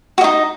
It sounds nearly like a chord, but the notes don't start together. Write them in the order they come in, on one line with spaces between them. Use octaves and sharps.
F#4 D#5 D#4